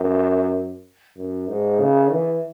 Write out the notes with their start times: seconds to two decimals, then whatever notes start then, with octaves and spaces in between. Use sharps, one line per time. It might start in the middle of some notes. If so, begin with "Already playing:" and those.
Already playing: F#2
1.17 F#2
1.48 G#2
1.80 C#3
2.11 E3